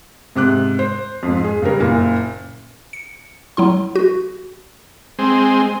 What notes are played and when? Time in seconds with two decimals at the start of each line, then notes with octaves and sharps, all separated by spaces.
0.36 G#2 C3 D6 F#6
0.79 C5
1.23 F2 G#2
1.44 G#4
1.62 G2 C#3 G3 A#4
1.80 F#1 A#2
2.93 C#7
3.57 F#3 E4 C6
3.96 F#4
5.19 G#3 C4